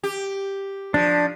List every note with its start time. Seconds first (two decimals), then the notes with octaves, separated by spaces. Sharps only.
0.04 G4
0.94 F3 D4